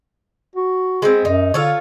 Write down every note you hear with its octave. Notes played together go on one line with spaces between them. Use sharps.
F#4
G#3 B3 C4
F#2 D#4
D3 F4 A4 C#5